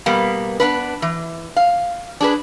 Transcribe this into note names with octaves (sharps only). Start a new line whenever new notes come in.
B2 G3 A#3 B3
B3 D4 B4
E3
F5
D4 G#4 B4